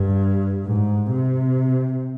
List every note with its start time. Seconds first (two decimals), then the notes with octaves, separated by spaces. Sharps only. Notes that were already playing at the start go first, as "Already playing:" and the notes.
Already playing: G2
0.66 G#2
1.11 C3